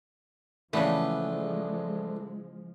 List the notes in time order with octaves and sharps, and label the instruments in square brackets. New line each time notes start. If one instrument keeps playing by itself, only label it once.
[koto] C#3 E3 [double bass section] F3 G#3 [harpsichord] A3 B3 D4